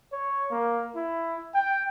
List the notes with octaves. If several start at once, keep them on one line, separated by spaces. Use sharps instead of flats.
C#5
A#3
E4
G5